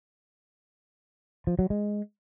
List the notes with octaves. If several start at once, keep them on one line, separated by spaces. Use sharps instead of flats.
F3
F#3
G#3